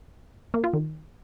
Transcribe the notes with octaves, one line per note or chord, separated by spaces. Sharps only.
A#3
F4
D#3